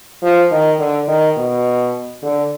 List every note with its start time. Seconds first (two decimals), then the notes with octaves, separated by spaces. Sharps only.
0.22 F3
0.51 D#3
0.79 D3
1.08 D#3
1.37 B2
2.22 D3